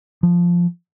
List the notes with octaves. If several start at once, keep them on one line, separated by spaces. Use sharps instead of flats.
F3